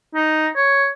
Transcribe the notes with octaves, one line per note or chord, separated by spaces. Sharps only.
D#4
C#5